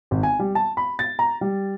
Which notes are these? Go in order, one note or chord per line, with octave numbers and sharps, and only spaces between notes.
G#1
G#5
G3
A5
B5
A6
A#5
G3